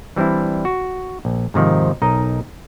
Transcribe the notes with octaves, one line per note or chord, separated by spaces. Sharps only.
E3 G3 C4 D4 E4
F#4
A#1
G#2 C3 D#3 F3
B1 D#4 A#4 D#5